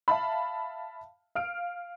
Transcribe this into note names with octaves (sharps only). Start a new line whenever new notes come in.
E5 F5 A5 B5
F5 F6 D7